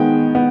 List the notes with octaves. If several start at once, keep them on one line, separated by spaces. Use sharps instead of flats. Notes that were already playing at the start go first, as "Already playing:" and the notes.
Already playing: D#3 G#3 B3 G5
B3